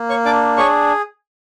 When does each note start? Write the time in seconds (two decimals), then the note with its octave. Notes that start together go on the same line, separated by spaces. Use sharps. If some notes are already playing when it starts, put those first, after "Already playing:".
Already playing: A#3
0.09 C#5 C#6
0.25 D4 D5 D6
0.57 G#4 C#5 C#6